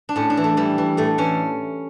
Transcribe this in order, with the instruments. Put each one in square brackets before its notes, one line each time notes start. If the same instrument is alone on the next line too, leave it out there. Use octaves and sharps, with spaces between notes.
[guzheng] D4
A2 C#4
D4
E3
A3
E3 G3
E3
A2 A3
E3 C#4